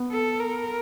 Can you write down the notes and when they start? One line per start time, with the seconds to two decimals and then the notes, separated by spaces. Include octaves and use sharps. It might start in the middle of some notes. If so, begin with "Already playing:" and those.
Already playing: B3
0.11 A4
0.40 A#4